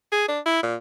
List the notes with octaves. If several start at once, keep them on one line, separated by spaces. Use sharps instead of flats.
G#4
D4
E4
A#2